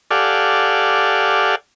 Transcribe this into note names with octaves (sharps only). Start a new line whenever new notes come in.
G4 A4 D5 F5 F#5 G#5